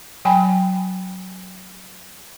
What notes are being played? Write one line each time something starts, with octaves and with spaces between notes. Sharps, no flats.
F#3 G5 G#5 B5